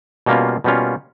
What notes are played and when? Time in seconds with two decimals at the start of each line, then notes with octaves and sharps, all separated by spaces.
0.26 B2 G3 A#3 C#4 F4
0.64 B2 G3 A#3 C#4 F4